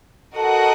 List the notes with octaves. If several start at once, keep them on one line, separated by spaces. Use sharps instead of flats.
F#4 A4 A#4 D#5 F#5